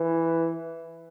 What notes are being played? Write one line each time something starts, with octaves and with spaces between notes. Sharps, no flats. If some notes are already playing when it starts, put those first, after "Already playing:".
Already playing: E3